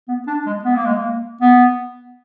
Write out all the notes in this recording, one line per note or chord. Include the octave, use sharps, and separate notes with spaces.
B3
D4
G#3
B3
A#3
G#3
A#3
B3